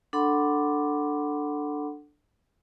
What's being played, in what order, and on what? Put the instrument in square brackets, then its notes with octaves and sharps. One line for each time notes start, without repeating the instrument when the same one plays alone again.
[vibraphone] D4 A4 F#5 B5 C6 D6